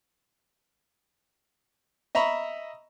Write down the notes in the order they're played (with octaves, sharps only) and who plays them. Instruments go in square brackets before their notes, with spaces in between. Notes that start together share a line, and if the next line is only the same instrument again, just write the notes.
[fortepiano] D#5 E5 A#5 B5 C#6